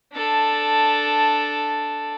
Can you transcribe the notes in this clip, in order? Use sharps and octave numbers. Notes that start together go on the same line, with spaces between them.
D4 A4